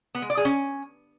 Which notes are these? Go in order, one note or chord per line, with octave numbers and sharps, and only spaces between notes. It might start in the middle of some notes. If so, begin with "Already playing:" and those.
B3
G#3
D5
G#4
C#4